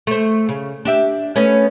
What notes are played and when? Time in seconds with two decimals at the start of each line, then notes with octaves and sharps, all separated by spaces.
0.07 A3 C5
0.49 C#3
0.85 D4 G4 E5
1.36 A3 B3 C#4